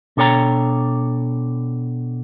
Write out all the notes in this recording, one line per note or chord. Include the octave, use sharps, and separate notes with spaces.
B2 D4 A4 C#5 G5 A#5